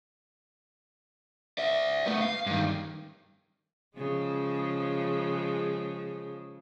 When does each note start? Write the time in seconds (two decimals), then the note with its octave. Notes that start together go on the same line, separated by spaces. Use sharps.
1.58 D5 E5
2.06 A3 B3
2.21 F5
2.46 G2 D#3
3.97 C#3 F3 G#3